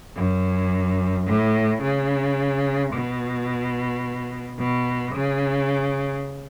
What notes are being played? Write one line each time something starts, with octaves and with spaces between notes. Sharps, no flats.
F#2
A2
C#3
B2
B2
C#3